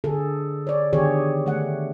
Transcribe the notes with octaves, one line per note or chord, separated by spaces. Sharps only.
D3 G#4 A4
C#5 D5
D3 D#3 B3 G4 G#4 C#5
A3 F#5